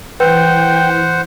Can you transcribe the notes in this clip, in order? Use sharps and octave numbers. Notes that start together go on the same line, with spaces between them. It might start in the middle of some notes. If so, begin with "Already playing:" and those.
E3 B4 C5 F#5 G5